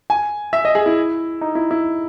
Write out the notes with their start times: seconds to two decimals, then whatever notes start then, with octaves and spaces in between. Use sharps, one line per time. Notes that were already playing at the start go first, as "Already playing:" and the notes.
0.10 G#5
0.53 E5
0.65 D#5
0.75 G#4
0.86 E4
1.41 D#4
1.55 E4
1.71 E4